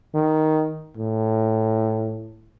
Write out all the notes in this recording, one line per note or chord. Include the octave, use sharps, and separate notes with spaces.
D#3
A2